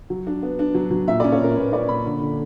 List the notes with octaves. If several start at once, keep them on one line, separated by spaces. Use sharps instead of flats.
F#3
D4
B3
D4
F#3
F#3
A#2 E5
D5
C#4
C#5
A#2 A#4
A#2 B4
C#4 D5
A#2 B5
D3
D3